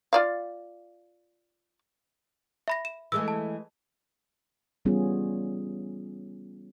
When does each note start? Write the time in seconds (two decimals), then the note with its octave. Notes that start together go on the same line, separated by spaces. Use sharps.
0.13 F4 D5 F5
2.68 E5 B5 A#6
2.85 E7
3.12 E3 G#3 A3 E6
3.28 A5
4.85 E3 G3 B3 C#4 F4 G#4